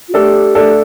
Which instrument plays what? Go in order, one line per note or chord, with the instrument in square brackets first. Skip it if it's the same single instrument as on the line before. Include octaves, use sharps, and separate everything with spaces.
[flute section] F4
[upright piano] A3 D4 A4 [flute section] G4
[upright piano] A3 D4 A4